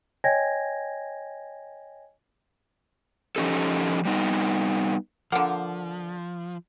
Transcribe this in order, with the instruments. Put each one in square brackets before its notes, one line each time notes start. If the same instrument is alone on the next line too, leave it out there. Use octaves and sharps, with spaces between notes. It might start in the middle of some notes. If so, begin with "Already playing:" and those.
[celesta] C#5 D#5 G5 G#5 G#6 A#6
[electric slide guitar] F3 C#4 D#4 G4 A4
G3 B3 D#4
[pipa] D3 A#3 [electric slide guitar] F3 [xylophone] F#5